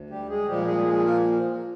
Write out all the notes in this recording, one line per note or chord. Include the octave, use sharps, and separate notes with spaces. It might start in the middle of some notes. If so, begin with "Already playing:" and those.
Already playing: D2
G3 G4
G#3 G#4
A#2 F3 G3 G#3 G4
G#3 G#4
G#3 G#4
A#3 A#4